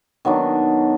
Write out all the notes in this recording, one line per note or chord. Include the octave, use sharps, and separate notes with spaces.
D#3 F#3 B3 D4